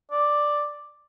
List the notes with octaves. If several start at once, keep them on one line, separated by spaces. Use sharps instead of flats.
D5